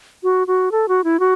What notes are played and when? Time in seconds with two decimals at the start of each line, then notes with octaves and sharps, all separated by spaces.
0.23 F#4
0.47 F#4
0.72 A4
0.88 F#4
1.04 E4
1.20 F#4